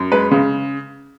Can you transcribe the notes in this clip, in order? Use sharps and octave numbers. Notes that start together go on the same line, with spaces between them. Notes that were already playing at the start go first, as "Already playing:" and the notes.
Already playing: F#2
G#3 B4
C#3